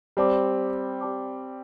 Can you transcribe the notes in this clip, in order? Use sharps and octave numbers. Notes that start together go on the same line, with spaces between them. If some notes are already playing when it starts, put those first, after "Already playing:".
G3 C4 G4 D5 A5 D6
G4 D5 A5 D6